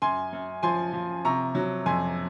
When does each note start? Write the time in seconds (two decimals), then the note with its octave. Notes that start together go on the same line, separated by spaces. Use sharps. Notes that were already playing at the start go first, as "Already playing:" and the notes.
0.02 F#2 G#5 C6
0.33 F#2
0.63 F3 G#5 C6
0.93 F3
1.25 C3 A#5 C#6
1.55 F#3
1.86 F2 G#5 C6